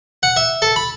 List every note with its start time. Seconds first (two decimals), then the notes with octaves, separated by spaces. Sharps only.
0.23 F#5
0.36 E5
0.62 A4
0.76 B5